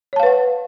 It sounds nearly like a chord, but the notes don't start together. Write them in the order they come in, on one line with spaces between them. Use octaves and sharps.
C#5 A5 F5 B4 F#5